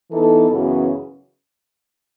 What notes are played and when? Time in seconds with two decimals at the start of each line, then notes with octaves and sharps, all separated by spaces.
0.10 E3 B3 D#4 A4
0.49 F#2 C#3 E3 B3 F#4